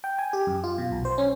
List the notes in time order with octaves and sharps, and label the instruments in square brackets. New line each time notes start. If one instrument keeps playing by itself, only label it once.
[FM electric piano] G5
G#5
G4
F#2
F4
B2
B1
C5
C#4